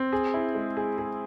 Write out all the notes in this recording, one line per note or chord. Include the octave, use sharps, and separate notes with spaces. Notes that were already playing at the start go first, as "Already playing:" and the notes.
Already playing: C4
G#4
E4
G#3
G#4
G#4